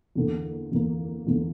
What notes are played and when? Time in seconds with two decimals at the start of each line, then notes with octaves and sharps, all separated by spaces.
0.15 E2 D3 A#3
0.72 E2 D3 A#3
1.27 E2 D3 A#3